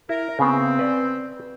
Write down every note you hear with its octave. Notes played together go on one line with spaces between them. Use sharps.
E4 A#4
C#3 B3 C4
B4 D5